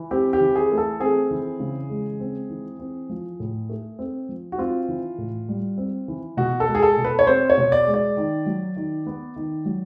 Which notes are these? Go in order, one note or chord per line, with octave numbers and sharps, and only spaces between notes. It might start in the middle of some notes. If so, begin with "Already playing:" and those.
Already playing: E3
C4 G4
G4
E3
G#4
A3
A4
C4 G#4
E3
C#3
G#3
C4
E3
C4
F3
A2
A3
C4
F3
F#4
C4 F4
E3
A2
G3
C4
E3
B2 F#4
A4
G#3
G#4
A4
B2
B4
C#5
C4 C5
C#5
B2
D5
G#3
D5
D#3
F#3
D#3
B3
D#3
F#3